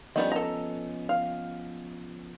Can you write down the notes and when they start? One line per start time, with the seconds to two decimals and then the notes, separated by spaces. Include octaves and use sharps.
0.16 D#3 F3 G3 B3 C#4 D4 D#5
0.32 A4 A#5
1.09 F5